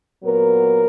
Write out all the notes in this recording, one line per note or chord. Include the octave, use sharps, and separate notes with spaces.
A#2 F#3 B3 A#4